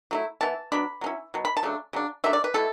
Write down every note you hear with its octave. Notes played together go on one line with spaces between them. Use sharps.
F#3 A3 E4
E3 B3 E4 A5
F#3 B3 D4 B5
F#3 C#4 E4
B2 F#3
B5
A5
C#3 F#3 A3 D4
C#3 F#3 D4
D3 F#3 A3 D4 E5
D5
B4
B2 A3 E4 A4